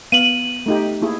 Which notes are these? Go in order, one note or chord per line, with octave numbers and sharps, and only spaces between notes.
B3 F5 D#7 F#7
A3 D#4 G4
A#3 E4 G#4